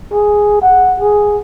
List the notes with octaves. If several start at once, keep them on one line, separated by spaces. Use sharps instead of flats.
G#4
F#5
G#4